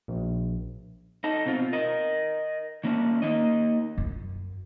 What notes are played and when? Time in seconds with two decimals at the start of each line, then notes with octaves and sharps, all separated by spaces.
0.08 A#1
1.24 D#4 A4
1.46 B2 C4 F4
1.73 A#4 D#5
2.84 D#3 A#3 C#4 D4
3.22 A#3 D#4 D#5
3.97 F#2